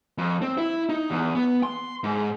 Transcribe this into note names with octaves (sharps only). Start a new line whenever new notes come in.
F2
C4
E4
D#4
E2
B3
C6
G#2